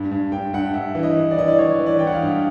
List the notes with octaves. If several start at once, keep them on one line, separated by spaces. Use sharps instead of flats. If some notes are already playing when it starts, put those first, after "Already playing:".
Already playing: G2
G2
G2 G5
G2 F#5
G2 E5
E3
D#5
E3
D5
E3 D#5
D5
E3 C#5
E3
D5
E3 G5
F#5
F5
G2